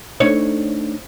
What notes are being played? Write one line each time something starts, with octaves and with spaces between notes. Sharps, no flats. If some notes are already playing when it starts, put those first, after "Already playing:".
A3 D4 D#4 C#5